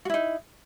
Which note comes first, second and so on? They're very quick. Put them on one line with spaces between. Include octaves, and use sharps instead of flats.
F#4 E4 D#4